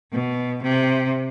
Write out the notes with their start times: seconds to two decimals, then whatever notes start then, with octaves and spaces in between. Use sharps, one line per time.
0.12 B2
0.62 C3